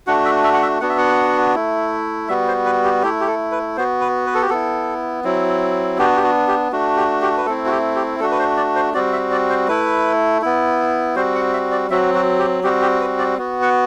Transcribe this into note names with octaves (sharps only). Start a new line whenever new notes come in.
A3 D4 F#4 F#5
E5
E5
F#5
E5
B3 D4 F#4 F#5
E5
F#5
A3 E4
G3 B3 F#4 E5
C5
B4
G4
A3 E4 G4
G4
A4
B4
B3 F#4 C5
B4
B4
A4
G4
B3 E4 A4
F#3 C4 E4
B3 D4 F#4 G4
G4
F#4
G4
A3 D4 F#4
G4
G4
B4
A3 C4 E4 A4
F#4
G4
G4
A3 D4 F#4 A4
B4
C5
D5
C5
G3 C4 F#4 D5
E5
D5
C5
A3 E4 B4
B3 E4
G3 C4 F#4 C5
F#5
E5
D5
F#3 C4 F#4 E5
F#4
G4
G3 C4 F#4 G4
G4
B4
D5
B3 F#4
F#5